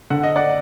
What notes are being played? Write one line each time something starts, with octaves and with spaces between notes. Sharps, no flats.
D3 F#5
D#5
D5 F#5